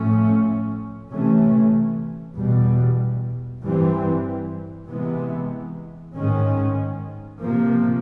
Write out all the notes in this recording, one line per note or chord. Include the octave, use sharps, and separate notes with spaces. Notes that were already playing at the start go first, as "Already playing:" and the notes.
Already playing: A2 F3 A3 C#4
C3 E3 A3 C#4
E2 B2 G3
G2 E3 G3 C4
C3 E3 G#3 B3
G#2 D#3 G#3 C#4
C3 F3 A#3